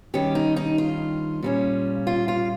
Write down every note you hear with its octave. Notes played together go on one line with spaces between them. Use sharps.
G2 D#3 G3 C#4 G4
D#4
D#4
F4
A#2 G3 C#4
F4
F4